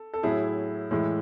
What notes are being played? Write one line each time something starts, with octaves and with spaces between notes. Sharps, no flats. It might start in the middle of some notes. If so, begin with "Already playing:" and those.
Already playing: A4
A4
A2 F#3 E4 G#4
A2 E3 G#3 E4